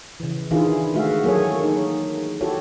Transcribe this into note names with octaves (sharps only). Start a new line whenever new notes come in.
C#3 E3
D#3 E3 D4 E4 F4 G#4
G#3 A3 F#4 E5 F5
F#3 A#3 G#4 A4 C#5
D#4
E4 F#4 G4 A4 C#5